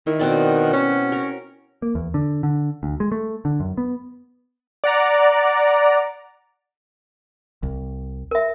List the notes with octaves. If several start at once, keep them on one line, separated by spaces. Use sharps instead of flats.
D#3 E4
B2 C4 D5
C#4 F#4
A#4
A#3
E2
D3
D3
D2
G#3
A3
D3
F#2
B3
D5 F#5 A#5
C2
A#4 E5